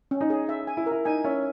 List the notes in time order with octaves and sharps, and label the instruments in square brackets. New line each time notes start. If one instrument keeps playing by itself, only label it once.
[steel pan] C#4
[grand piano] D#4
[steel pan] G#4
E5
G#5
[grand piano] E4
[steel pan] A#4
[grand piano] E4
[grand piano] D#4 [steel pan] G#5
[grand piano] C#4 [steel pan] E5